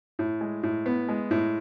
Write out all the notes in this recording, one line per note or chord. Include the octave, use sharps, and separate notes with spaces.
A2
G#3
A2
B3
G#3
A2